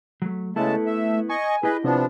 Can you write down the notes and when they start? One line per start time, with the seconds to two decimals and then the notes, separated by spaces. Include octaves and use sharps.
0.22 F#3 A3
0.56 C#3 G#3 A3 B3 E4 A5
0.86 E5
1.29 D#5 G#5 C#6
1.63 E4 G4 G#4 B4 D#5
1.84 C3 F3 B3 D4